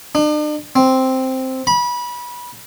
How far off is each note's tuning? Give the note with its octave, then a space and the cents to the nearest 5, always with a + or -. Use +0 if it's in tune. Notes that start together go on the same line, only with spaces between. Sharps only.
D4 +45
C4 +0
B5 -25